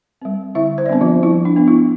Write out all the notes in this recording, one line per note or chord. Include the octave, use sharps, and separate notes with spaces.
G3 C4
D3 E4 E5
C5
D5
G3 B3 C4 D4 C5
F3 F4
F3 E4
D4
B3 D4
E4